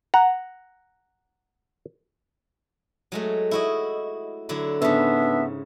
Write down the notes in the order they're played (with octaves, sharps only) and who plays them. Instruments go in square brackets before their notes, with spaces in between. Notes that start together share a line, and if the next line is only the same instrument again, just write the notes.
[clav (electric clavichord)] F#5 A#5
[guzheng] F#3 G#3 A3
E4 F#4 D#5
D3 F#3 E4
[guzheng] G#2 C#3 [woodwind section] B3 D4 E5